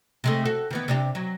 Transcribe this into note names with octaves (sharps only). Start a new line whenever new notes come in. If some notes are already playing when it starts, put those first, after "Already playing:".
C3 G#3 A3
F#4 A4
D#3 E3 B3
C3 D4 G4
F#3